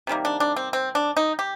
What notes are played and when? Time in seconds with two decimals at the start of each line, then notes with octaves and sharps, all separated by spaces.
0.07 C3 D#3 G3 A#3
0.25 D4
0.40 D4
0.56 C4
0.73 C4
0.95 D4
1.17 D#4
1.39 G4